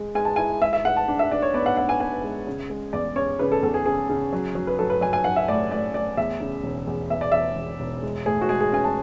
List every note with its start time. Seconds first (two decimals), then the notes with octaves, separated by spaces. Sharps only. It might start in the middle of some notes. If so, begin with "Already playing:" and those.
Already playing: G#2 G#3
0.15 G#3 G#5
0.25 A5
0.36 E4 G#5
0.61 G#3 E5
0.73 E5
0.85 G#3 F#5
0.96 A5
1.08 D4
1.19 E5
1.31 D4 D5
1.42 C#5
1.54 B3 D5
1.66 F#5
1.77 D4 F#5
1.89 G#5
2.00 B3 G#5
2.24 G#3
2.47 C#3
2.70 G#3
2.93 E2 D5
3.16 C#4 C#5
3.39 C#3 B4
3.52 A4
3.63 E2 A4
3.74 G#4
3.86 C#3 G#4
4.09 C#3
4.33 F#3
4.55 F#3
4.67 B4
4.79 F#3 A4
4.90 B4
5.01 F#3 G#5
5.13 G#5
5.24 F#3 F#5
5.36 E5
5.48 A2 D5
5.71 A2 D5
5.94 A2 D5
6.17 E2 E5
6.40 C#3
6.64 E1
6.87 E2
7.10 E2 E5
7.21 D5
7.32 E1 E5
7.56 E1
7.80 E1
8.03 G#3
8.26 A2 G#4
8.41 F#4
8.49 G#3 G#4
8.60 G#4
8.72 C#4 G#5
8.84 A5